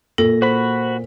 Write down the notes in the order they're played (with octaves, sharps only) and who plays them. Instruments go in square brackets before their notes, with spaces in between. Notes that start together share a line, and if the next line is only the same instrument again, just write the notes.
[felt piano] A#2 [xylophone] A4 [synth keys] A#6
[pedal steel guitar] F#4 B5 [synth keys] C5 B6